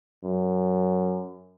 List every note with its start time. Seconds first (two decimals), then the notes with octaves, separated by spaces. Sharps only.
0.24 F#2